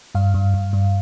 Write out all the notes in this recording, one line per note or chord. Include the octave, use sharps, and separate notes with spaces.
G2 F5
G2
G2
G2